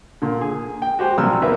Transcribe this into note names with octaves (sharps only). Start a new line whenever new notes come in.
A#2 D3
G#4
G5
F#4 G4 C5 G5 G#5
A#1 C3 F#3 G3 E6 F6
D#2 B3 A#4 B4 E5